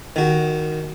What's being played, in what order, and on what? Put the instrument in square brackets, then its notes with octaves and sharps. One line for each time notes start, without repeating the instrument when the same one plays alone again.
[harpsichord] D#3 F#4